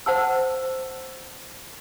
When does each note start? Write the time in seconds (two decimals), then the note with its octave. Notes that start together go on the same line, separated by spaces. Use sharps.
0.06 C5 F#5 A5 E6